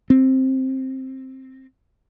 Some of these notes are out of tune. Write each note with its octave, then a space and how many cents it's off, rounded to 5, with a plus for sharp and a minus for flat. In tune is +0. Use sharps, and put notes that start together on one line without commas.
C4 +10